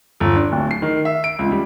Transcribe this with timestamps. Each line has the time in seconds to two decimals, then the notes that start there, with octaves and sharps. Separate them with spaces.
0.20 G1
0.36 D4
0.52 D1
0.71 C7
0.82 D#3
1.05 E5
1.24 D7
1.39 C#2
1.51 G3